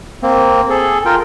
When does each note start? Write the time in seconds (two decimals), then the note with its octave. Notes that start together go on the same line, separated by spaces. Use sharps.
0.23 A#3 C4
0.70 G#4 A4
1.05 F4 A#4 G5